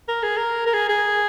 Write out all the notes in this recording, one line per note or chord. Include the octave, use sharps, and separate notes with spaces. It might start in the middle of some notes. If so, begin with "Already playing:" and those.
A#4
G#4
A#4
A#4
G#4
G#4